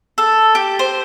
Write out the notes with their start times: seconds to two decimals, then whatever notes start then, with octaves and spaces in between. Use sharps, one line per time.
0.18 A4
0.55 G4
0.79 C5